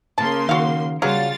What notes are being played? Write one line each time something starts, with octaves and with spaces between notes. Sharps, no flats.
C#3 A#3 A5 C6
D#3 F#4 F5
C#3 F#3 G3 F4 G#4 F5 A6